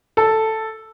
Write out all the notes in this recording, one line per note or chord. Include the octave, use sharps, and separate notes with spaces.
A4